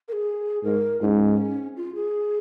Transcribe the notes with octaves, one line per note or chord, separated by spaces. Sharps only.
A#4
G#4
G#2 A#4
G#2 C#4 F4
F4
G#4